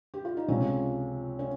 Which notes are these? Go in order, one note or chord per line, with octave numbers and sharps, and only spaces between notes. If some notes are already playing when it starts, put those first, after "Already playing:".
G4
F4
D#4
C#2 C3 F3 C#4
C#4